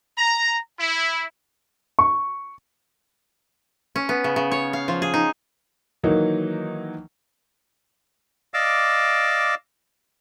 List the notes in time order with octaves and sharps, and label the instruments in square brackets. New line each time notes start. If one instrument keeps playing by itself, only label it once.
[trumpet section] A#5
E4
[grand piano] C#6
[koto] C#4
B3
C#3
C#3
C#5
F5
F3
G#4
D#4
[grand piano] D#3 E3 F#3 A#3 D#4
[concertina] D5 D#5 F5 D6 E6